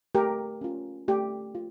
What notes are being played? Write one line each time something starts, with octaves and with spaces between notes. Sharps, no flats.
A3 G4 A#4
C#4 F4
A3 G4
F4